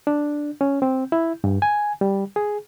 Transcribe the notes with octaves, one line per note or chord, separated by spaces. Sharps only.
D4
C#4
C4
E4
G2
G#5
G3
G#4